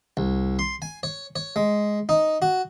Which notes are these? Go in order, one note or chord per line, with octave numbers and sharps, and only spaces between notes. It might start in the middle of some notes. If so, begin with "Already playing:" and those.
C2
C6
G#5
C#5
C#5
G#3
D#4
F#4